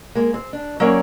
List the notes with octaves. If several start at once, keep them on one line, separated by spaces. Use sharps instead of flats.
G#3 A#3
C4
D4
F#3 A#3 C#4 A#4 C#5 D5